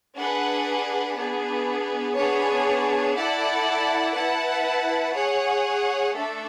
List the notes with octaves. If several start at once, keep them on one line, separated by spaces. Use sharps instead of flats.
D4 G#4 B4 F#5
B3 D4 G#4
B3 D4 G#4 C#5
E4 A4 D5 F#5 A5
E4 B4 F#5 A5
G#4 C#5 F#5
A3 D4 A4 E5